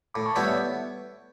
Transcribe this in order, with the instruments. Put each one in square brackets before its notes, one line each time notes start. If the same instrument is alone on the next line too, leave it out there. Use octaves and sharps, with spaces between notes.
[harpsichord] A2 [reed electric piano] B5 D6
[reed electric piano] A5 C#6
[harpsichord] G3 B3 E4 [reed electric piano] D5 F#5
[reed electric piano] C#5 E5